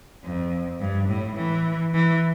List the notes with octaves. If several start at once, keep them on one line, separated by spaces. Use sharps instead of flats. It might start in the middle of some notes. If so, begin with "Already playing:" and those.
F2
G2
A2
E3
E3